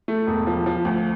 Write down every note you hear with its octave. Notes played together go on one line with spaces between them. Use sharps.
A3
E1
F3
F3
D2